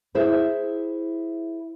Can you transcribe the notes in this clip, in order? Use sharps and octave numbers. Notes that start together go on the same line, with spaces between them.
E4 G#4 C5 E5